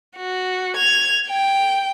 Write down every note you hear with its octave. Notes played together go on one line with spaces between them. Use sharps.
F#4
G#6 F7
G5